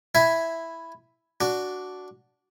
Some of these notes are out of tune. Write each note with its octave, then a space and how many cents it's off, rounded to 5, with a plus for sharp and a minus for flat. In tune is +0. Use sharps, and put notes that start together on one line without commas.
E4 +0 E5 +0 G#5 +0
D4 -10 F#4 +0